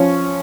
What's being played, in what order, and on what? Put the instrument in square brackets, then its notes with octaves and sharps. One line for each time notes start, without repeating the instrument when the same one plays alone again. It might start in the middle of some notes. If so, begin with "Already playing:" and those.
Already playing: [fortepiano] F3 C#4